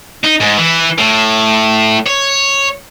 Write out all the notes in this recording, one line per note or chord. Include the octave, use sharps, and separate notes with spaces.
D#4
G#2
E3
A2
C#5